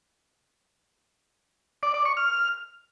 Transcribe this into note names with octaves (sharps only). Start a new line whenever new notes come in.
D5
D5
C#6
F6